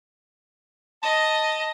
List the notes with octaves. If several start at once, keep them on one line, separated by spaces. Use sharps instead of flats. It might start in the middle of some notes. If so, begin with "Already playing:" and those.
D#5 A5